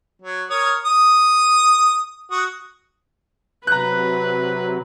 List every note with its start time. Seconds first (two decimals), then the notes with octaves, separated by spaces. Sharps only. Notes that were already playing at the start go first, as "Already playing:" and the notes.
0.22 F#3
0.50 A#4 C#5 D#6
0.85 D#6
2.31 F#4 D#6
3.67 C3 F#3 B4 A#5 F#6